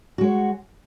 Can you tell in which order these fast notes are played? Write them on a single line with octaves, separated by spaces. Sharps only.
F#4 G#3 C#5